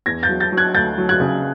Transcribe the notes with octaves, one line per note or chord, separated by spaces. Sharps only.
E2 G#6 A#6
G6 A6
F#3
G6 A6
F#3
F#6 G#6
D2 G6 A6
F#3
F#6 G#6
C#3